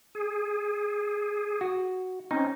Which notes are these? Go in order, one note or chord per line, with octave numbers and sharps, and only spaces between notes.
G#4
F#4
C4 C#4 D#4